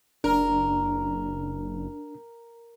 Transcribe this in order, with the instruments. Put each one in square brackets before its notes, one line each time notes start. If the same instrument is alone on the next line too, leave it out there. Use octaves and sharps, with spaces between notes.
[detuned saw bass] F#1 [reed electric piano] D4 [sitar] A#4